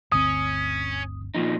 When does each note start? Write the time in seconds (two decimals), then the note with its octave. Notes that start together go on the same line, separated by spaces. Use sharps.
0.12 G1 D2 C4 C#4 D#6
1.35 A#2 F3 D#4